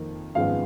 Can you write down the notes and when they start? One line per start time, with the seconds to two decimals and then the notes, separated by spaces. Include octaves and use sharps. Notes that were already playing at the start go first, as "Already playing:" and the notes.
Already playing: F2 D#3 A#3
0.35 G#1 F#2 F3 G#3 B3 F5